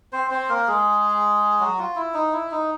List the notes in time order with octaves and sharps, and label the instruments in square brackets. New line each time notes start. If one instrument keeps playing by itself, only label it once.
[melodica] C4 C5
C4 C5
A#3 A#4
G#3 G#4
F#3 F#4
F4
E4
D#4
E4
D#4